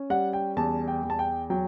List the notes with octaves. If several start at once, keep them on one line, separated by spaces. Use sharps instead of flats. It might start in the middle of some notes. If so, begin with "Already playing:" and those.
Already playing: C#4
G3 F#5
G5
E2 A5
G5
E2
A5
G5
F#3 G5